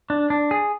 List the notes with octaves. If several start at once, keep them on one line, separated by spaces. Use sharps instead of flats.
D4
D4
G#4